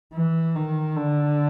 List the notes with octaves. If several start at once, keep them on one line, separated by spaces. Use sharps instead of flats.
E3
D#3
D3